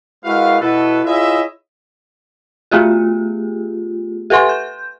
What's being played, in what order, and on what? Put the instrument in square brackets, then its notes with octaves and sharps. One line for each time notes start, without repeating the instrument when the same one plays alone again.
[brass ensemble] G#3 E4 F#4 A#4 B4 F5
B2 E4 A4 B4
E4 F4 G#4 C#5 D#5 E5
[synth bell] A3 B3 F4 G4 G#4
G4 A4 B4 E5 C6
G6